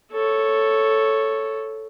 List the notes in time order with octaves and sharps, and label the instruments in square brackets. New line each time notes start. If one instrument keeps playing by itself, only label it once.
[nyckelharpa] A4 C#5